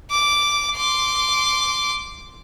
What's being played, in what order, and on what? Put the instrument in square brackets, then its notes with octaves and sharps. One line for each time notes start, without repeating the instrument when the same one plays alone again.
[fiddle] D6
C6 D6